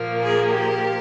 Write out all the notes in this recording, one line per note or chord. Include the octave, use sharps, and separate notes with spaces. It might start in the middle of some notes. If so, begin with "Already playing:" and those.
Already playing: A#2 F3 A#3
G#4
G4